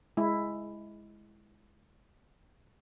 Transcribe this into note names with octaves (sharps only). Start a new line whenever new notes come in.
G#3 E4